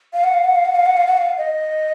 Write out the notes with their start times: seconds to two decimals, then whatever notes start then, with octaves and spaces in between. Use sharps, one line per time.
0.13 F5
0.24 F#5
0.34 F5
0.44 F#5
0.55 F5
0.65 F#5
0.76 F5
0.86 F#5
0.97 F5
1.07 F#5
1.17 F5
1.38 D#5